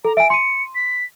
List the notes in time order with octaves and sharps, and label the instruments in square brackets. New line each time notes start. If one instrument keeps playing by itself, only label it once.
[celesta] A4 [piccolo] A#5
[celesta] E5 G#5 [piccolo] D7
[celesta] C6 D#7 [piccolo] C#7
[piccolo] B6